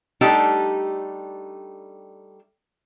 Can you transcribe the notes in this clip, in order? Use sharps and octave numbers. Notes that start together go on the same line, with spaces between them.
G3 A3 D4 D#4 G4 A4